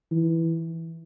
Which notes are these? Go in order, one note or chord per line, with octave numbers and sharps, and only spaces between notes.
E3